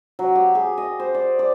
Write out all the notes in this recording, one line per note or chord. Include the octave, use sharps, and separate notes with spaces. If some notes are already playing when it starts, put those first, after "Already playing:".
F#3
G4
G#4
D#5
C5
D5
D5